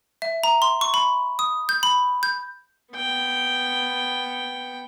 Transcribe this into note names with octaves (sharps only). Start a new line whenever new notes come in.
E5
A#5
C6
C#6
B5
D#6
G6
B5
G6
B3 G5